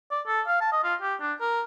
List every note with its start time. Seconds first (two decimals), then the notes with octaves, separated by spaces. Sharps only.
0.11 D5
0.27 A4
0.47 F5
0.61 A5
0.72 D#5
0.84 F4
1.02 G4
1.21 D4
1.40 A#4